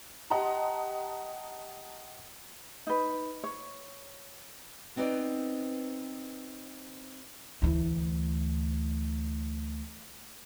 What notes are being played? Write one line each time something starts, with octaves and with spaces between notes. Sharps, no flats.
G4 D#5 F#5 A5 A#5 C6
D#4 B4
C#5
B3 C4 D#4 B4 D5
D2 E3